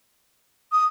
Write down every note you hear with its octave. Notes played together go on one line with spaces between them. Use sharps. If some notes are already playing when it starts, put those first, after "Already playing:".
D#6